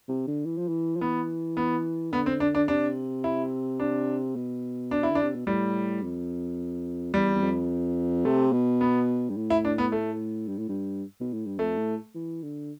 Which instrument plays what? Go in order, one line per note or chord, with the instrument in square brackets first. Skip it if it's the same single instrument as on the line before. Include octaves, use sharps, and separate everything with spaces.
[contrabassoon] C3
D3
E3
F3
E3
F3
[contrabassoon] E3 [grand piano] B3
[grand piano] B3
[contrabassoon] D3 [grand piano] B3
[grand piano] C4
D4
D4
[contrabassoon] C3 [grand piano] D4
[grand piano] E4
D4
[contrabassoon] B2
[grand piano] D4
E4
[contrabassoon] D3 [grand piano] D4
[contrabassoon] C3
B2
[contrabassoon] A2 [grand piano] G3
[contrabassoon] F2
[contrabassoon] E2 [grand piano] G3
[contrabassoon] E2
F2
[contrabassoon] C3 [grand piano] A3
[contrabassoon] B2
[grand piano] B3
[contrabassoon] G2
A2
[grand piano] E4
D4
B3
A3
[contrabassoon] G2
A2
G2
B2
A2
G2
[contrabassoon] F2 [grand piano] A3
[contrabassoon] A2
E3
D3